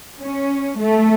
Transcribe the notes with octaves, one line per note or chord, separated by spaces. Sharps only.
C#4
A3